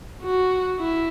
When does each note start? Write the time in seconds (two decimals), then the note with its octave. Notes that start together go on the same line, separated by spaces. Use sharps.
0.23 F#4
0.80 E4